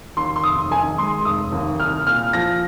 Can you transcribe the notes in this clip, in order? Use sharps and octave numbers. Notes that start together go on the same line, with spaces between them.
D#2 C6
C6
F1 D#6
D#3 G#5
G#3 C6
F1 D#6
D#2
C2 F6
A#2 F6
F3 A#6